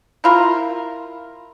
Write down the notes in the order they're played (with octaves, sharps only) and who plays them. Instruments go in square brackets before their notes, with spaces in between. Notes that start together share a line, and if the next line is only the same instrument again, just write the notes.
[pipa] E4 F4 A#4